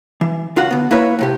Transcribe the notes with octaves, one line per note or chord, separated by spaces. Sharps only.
E3
C#2 F4 F#4 F#5
D3 B3
A#3 E4 B4 C#5 E5
A2 C3 G4